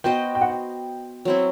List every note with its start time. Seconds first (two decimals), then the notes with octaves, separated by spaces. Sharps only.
0.04 B3 F#4 C5 D#5 G5
0.35 G5
0.41 F#5
0.49 G5
1.25 F#3 C4 E4